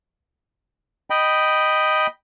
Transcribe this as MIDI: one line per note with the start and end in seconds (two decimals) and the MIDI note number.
1.10 2.07 75
1.10 2.07 79
1.10 2.07 83